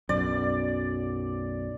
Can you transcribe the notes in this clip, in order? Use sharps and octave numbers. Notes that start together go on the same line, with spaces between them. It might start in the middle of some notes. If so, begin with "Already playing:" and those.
B1 F#2 D5